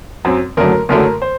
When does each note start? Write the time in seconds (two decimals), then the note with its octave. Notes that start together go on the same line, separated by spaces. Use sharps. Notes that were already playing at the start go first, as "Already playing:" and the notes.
0.25 F#2 F#3 C4
0.57 F#1 F#2 D3 F#3 A3 A#4
0.89 F#1 F#2 D3 F#3 A3 A#4
1.22 C5